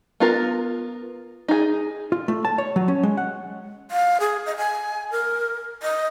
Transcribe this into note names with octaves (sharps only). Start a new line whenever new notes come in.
B3 F4 A#4
D#4 G#4
F4
A3
A5
C#5
F#3
C#4
G#3
F#5
F5
G#4
D#5
G#5
A#4
D#5